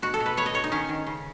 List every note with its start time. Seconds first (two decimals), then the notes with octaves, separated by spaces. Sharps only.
0.02 B2 F#4
0.14 A4
0.20 B2
0.26 B4
0.37 B3 C#5
0.46 D#5
0.54 B2 C#5
0.64 D#4
0.72 D#3 C#4
0.89 D#3
1.07 C#3